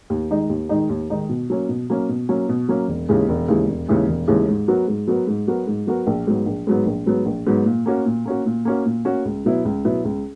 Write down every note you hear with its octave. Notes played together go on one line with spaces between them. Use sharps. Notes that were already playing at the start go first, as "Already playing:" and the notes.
D#2
D#3 G#3 D#4
D#2
D#3 G#3 D#4
D#2
D#3 G#3 D#4
B2
F#3 A#3 C#4
B2
F#3 A#3 C#4
B2
F#3 A#3 C#4
B2
F#3 A#3 C#4
E1
D#2 C#3 E3 G#3
E1
D#2 C#3 E3 G#3
E1
D#2 C#3 E3 G#3
E1
D#2 C#3 E3 G#3
G#2
F#3 B3 F#4 A#4
G#2
F#3 B3 F#4 A#4
G#2
F#3 B3 F#4 A#4
G#2
F#3 B3 F#4 A#4
A#1
G#2 F#3 B3
A#1
G#2 F#3 B3
A#1
G#2 F#3 B3
A#1
G#2 F#3 B3
A#2
A#3 C#4 F#4
A#2
A#3 C#4 F#4
A#2
A#3 C#4 F#4
A#2
A#3 C#4 F#4
C#2
B2 F#3 B3 E4
C#2
B2 F#3 B3 E4
C#2